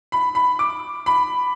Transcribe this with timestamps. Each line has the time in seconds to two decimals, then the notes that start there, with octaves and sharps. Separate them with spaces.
0.12 B5
0.35 B5
0.59 D6
1.06 B5